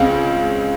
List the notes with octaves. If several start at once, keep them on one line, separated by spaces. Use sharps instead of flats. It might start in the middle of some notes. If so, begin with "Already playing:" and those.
Already playing: C#2 C#3 C4